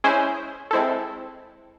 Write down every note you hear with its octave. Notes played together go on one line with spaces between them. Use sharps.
G#3 C#4 E4 G#4 C5
G#3 C4 E4 A4